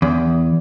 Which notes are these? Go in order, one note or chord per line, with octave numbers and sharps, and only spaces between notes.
E2